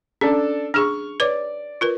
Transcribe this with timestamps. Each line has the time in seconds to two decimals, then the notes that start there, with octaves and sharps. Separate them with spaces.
0.21 C#4 D4 A4
0.74 D4 G#4 C#6 F6
1.20 B4 C#5 D5 D6
1.81 F4 A#4 B4